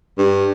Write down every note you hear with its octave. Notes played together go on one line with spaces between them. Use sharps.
G2